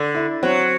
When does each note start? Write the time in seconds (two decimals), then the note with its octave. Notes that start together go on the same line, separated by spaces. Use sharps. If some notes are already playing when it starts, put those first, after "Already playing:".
Already playing: D3
0.15 E4
0.43 F#3 C4